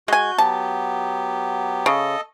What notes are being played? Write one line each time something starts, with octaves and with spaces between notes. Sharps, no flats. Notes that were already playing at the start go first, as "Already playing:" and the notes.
G#3 F#4 G#5 G6
F#3 B3 G4 A5
C#3 A4 D#5